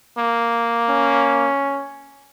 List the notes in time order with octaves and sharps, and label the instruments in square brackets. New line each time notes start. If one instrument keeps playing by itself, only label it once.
[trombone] A#3
[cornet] C#4